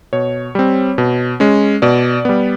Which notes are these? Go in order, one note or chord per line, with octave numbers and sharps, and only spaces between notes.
B2 C#5
G3 C4
B2
G#3 C#4
B2 D5
G3 B3